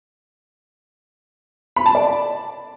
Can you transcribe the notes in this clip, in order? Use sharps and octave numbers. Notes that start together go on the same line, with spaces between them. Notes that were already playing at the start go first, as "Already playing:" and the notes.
B5
A5
D5